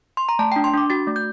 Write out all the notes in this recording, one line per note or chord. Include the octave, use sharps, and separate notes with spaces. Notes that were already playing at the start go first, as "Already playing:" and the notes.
C6
A#5
A3 A5
G5
D4
C6
D4 D6
F#4 A6
A3
G6